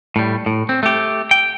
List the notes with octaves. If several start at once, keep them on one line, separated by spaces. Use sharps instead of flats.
A2 G3
A2
C4
A3 G4
G5